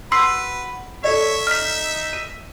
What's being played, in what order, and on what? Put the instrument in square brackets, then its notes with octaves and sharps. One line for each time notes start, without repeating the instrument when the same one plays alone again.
[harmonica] F#4 B4 [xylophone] C6 E6 C7
[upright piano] A4 D5 [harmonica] C#5 [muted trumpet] E5
[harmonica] D#4 [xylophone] F6 B6
[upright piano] D#7